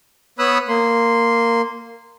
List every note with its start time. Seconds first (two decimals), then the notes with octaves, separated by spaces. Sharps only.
0.39 B3 C#5 B5 D#6 E6 F#6
0.68 A#3 C6